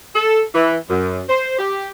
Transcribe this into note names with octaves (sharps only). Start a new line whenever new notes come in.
A4
E3
F#2
C5
G4